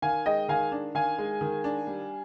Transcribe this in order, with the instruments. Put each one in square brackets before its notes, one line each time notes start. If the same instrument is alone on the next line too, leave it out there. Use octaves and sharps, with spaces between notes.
[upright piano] D#3 [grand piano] F5 G#5
[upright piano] G#3 [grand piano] D#5 G5
[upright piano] D#3 [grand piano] F5 G#5
[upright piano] D4
[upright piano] D#3 [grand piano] F5 G#5
[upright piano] G#3
D#3
D4
G3